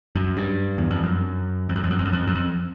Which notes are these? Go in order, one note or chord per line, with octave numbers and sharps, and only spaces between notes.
F#2
G2
E2
F2
F#2
F2
F#2
F2
F#2
F2
F#2
F2
F#2
F2